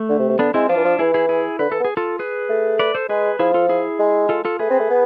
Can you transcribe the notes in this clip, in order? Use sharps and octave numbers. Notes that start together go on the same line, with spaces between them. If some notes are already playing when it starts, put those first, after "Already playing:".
Already playing: A3
D3
C3
C3
D3 B3 D4
G#3 C4 E4
F3 D4 F4
E3
F3
E3 E4 G#4
E4 G#4
E4 G#4
D3 B4
E3 A4
B3
G#4
F4 A4
G#4 B4
A3
B4 D5
A4 C5
G#3 G#4 B4
F3 E4 G#4
F4 A4
E4 G#4
G#3
F4 A4
F4 A4
A3 G#4 B4
C4
A3
B3